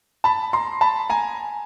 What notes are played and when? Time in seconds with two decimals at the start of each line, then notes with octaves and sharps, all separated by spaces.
0.24 A5 B5
0.53 A#5 C6
0.81 A5 B5
1.10 G#5 A#5